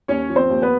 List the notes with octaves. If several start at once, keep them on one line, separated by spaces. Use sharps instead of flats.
D#2 C#4 C#5
F3
C4 C5
D#2
B3 B4